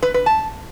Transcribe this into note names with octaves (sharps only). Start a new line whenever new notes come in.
B4
B4
A5